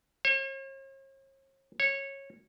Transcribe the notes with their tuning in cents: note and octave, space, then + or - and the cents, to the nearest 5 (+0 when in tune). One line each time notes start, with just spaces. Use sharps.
C#5 -45
C#5 -15